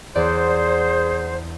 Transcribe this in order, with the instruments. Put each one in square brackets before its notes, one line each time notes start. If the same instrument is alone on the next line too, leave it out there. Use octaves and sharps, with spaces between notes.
[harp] E2 D5 F#5 [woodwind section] G#4 C5